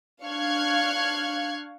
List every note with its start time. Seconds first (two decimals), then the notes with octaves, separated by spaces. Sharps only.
0.24 D4 F5 C#6 F6 F#6 G#6